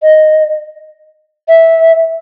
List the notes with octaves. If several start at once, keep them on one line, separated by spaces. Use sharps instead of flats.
D#5
E5